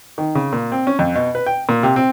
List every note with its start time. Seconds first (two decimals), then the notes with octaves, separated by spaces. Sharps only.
0.18 D#3
0.35 C#3
0.53 A#2
0.72 C4
0.87 C#4
0.99 F2
1.15 B2
1.35 B4
1.46 G5
1.69 A#2
1.83 C3
1.96 C4